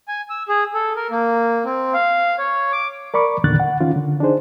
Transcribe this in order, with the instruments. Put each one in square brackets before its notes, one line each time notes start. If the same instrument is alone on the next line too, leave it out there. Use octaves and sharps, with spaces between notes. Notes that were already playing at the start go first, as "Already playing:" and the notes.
[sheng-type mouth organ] G#5
E6
G#4
A4
A#4
A#3
C4
F5
C#5
D6
[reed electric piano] A#4 D5 B5 C#6 D6
E2 A#2 D3 D#3 F#6 A6
F#5
D#3 C#4 F4
D3
D4 D#4 G#4 C5